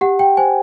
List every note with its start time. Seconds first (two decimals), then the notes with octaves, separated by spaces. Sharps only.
0.01 G4 F#5
0.19 G5
0.37 C5 G#5